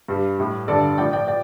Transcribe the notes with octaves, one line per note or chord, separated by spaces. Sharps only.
G2 G3
A2 G3
G2 D3 G3 A4 D5
A2 F3 D5 G5
D5 G5
D5 G5